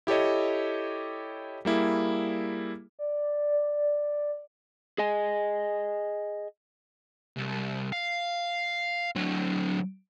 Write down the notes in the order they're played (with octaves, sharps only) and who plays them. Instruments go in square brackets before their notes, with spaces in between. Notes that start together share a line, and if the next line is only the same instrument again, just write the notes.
[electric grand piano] E4 G4 A4 C#5 D#5
G3 A#3 E4 G#4
[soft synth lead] D5
[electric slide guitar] G#4 D#5 G#5
[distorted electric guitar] C2
F5
D3 F#3